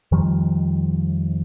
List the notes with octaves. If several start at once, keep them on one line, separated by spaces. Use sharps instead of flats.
F2 D#3 F3 G3